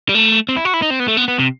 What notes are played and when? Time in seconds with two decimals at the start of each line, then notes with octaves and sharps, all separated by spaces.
0.09 G3
0.15 A3
0.49 C4
0.56 E4
0.65 F#4
0.74 E4
0.82 D#4
0.90 C4
1.00 B3
1.08 A3
1.17 B3
1.28 B3
1.39 C3